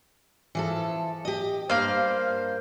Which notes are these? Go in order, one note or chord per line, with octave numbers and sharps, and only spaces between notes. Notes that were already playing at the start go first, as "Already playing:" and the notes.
E3 F3 A4
G4 D#5
G2 A#3 C5 F5